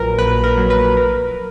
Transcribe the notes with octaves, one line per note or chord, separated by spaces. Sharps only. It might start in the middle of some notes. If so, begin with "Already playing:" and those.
Already playing: A#1 A#2 F#3 A#4 B4
A#1 B4
A#4
A#2 F#3
B4
A#4